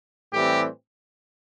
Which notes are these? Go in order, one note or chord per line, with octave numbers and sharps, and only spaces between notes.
A2 E3 G3 C4 G4